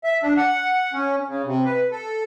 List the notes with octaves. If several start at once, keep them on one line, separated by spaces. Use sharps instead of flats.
E5
D4
F#5
C#4
C#3
C3
B4
A4